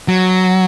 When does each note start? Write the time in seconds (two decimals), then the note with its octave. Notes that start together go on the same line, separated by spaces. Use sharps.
0.08 F#3